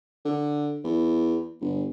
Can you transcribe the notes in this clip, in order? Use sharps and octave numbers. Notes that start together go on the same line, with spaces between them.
D3
E2
G1